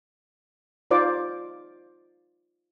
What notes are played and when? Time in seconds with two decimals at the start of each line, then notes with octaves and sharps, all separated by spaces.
0.91 D#4 F4 C5 D5 D6